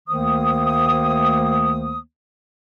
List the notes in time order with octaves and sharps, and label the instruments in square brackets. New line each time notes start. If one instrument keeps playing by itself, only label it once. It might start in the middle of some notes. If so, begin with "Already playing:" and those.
[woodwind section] D2 D#3 A3 A#3 C5 D#6